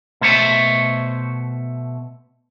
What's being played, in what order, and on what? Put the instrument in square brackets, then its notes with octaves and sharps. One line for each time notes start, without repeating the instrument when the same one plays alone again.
[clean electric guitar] B2 A3 C5 C#5 E5